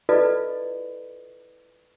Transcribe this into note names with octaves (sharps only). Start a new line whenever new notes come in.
E4 F4 A4 B4 D5 D#5